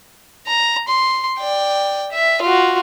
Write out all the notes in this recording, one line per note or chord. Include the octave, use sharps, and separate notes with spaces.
A#5
C6
D5 G5
E5
F4 F#4